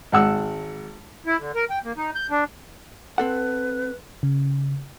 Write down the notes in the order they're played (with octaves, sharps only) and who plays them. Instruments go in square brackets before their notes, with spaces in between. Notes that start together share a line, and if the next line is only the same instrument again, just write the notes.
[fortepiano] G#1 F#5 E6
[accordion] E4
D3
A#4
G5
A#3
D#4
G6
D4
[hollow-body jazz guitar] C4 A4 F#5 [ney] B4
[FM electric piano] C#3